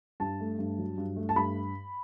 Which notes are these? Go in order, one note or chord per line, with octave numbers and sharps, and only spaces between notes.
G2 A5
A3
G2
F#3
G2
A3
A5
G2 B5